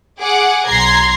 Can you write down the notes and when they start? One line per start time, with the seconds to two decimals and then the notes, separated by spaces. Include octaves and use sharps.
0.20 G#4 F#5 D6
0.68 B1 A#5 C6 G#6 A#6 C7